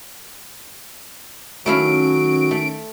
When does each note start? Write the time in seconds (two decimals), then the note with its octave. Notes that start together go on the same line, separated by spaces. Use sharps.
1.66 D#3 F#3 A3 C#4 E4 F5 D7
2.51 A3